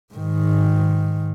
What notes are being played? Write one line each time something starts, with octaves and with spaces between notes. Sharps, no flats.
G#2 D#3